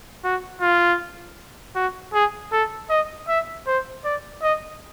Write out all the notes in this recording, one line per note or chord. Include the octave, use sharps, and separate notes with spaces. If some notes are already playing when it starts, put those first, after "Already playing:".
F#4
F4
F#4
G#4
A4
D#5
E5
C5
D5
D#5